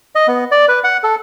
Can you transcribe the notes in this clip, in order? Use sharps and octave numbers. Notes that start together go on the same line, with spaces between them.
D#5
B3
D5
B4
F#5
A4